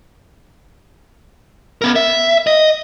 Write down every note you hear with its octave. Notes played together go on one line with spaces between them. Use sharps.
B3 A#4
E5
D#5